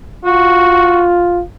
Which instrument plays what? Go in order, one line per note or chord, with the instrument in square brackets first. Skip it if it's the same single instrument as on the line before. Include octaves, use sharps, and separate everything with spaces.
[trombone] F4 [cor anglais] F#4